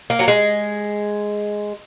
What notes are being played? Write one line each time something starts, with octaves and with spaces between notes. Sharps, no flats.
A#3
F#3
G#3